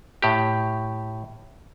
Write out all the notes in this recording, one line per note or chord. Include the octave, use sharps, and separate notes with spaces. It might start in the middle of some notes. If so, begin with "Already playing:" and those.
A2 G4